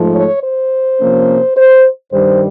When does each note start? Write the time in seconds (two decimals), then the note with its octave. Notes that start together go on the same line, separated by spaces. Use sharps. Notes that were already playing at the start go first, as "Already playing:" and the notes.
Already playing: G#2 F3 A3
0.15 C#5
0.44 C5
1.00 C3 F3 A#3 C#4
1.57 C5
2.13 G2 D#3 G3 C5